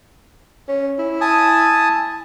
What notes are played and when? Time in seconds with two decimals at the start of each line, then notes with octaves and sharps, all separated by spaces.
0.68 C#4
0.99 E4
1.21 G#5 A5 D#6